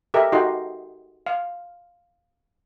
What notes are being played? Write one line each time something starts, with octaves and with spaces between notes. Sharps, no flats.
G4 A4 A#4 D#5 E5
D#4 F#4 G4 A4 D#5 C6
F5